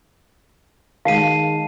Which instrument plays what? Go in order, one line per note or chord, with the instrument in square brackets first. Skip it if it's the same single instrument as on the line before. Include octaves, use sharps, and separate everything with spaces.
[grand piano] D#3 G#3 [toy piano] F5 [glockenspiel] A5 C7 D#7